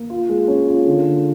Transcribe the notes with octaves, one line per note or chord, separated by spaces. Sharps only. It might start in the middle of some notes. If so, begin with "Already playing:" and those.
Already playing: A#3
F4
G#3
C#4
F4
D3
D3